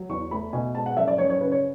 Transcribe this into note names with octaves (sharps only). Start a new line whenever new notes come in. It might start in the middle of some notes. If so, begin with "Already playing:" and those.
Already playing: F#3
E2 C#6
A3 B5
B2 G#5
G#3 A5
F#5
F#2 E5
D5
F#2 C#5
C#5
C#3 B4
C#5